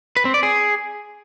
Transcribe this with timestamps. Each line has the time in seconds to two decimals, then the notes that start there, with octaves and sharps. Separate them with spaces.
0.17 B4
0.25 C4
0.34 D5
0.43 G#4